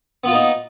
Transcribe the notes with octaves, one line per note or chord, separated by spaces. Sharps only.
A#3 B3 D#4 F4